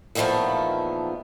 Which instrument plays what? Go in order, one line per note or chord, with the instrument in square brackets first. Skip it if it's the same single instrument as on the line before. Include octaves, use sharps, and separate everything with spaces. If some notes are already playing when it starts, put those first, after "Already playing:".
[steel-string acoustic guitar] E2 A#2 D#3 F3 A3 B3